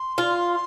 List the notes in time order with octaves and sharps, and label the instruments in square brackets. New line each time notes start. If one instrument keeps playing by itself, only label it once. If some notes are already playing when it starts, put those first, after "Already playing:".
Already playing: [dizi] C6
[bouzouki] F4